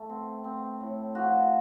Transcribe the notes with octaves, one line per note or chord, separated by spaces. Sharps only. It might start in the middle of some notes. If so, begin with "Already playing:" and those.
Already playing: A3
C4
C4
A2
F3 F#4